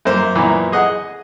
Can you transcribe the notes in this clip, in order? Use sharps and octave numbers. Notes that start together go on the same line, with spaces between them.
F#2 A#3 C5
F#2 A#2 E3 B3
G#4 D#5 F#5